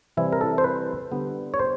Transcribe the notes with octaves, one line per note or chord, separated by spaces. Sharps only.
C3 E3 G3 C4 E4
A#4
A4
C5
B4
D3 G3 B3
C#5
C5